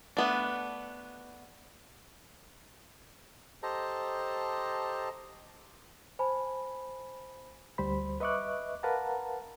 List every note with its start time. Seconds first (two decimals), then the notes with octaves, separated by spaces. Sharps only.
0.17 A3 B3 D4
3.63 G4 A4 C5 D#5 A5 A#5
6.19 C5 G#5 A5 B5
7.78 D2 G3 C5 B5
8.20 B4 D#5 E5 C#6 D6 F#6
8.83 A#4 B4 F5 F#5 A5 A#5